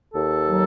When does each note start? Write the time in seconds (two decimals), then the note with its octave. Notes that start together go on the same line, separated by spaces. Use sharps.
0.14 D#2 A4
0.47 F#3